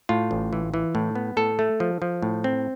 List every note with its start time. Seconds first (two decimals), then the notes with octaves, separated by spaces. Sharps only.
0.09 A2 F4
0.31 A1
0.53 E3
0.74 E3
0.95 A2
1.15 B3
1.37 A2 A4
1.59 A3
1.80 F3
2.02 F3
2.22 A2
2.44 C4